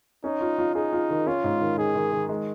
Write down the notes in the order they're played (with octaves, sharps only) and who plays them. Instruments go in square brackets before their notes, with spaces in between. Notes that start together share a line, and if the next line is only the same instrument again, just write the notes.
[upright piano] C#4 [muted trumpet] D#4
[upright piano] F4
F4
[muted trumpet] D#4 [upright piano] G#4
[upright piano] F4
D#3
[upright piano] C#4 [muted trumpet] F4
[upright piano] G#2
D#3
[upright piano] D#3 [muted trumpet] G#4
[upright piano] D#3
D#3
G#3